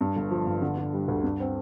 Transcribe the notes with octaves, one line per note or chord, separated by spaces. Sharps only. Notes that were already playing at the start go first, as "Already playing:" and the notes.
G2
G1
F3
G1
D3
D4
G3
D2
G2
C4